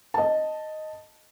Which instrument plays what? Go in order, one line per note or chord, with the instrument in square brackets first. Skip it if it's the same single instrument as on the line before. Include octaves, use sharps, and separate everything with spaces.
[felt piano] D#5 A5